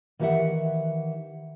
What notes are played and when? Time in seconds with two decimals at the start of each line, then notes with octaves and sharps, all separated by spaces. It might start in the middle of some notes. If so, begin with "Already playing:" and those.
0.19 D#3 E3 F#4 G4 E5 F#5